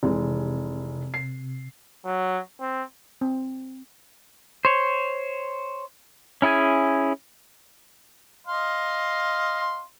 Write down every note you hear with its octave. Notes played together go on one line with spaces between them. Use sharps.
F1 C3 E3 G#3
C7
F#3
C4
C4
C5 C#5
C#4 E4 G#4 G#5
D#5 F5 C6